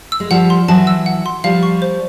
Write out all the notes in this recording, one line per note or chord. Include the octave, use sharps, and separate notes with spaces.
E6
G#3
F3 G3 F#5
C6
E3 F#3 A5
E6
F#5
C6
F3 G3 F5
C#6
C5